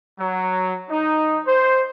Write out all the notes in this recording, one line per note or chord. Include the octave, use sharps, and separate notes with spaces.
F#3
D#4
C5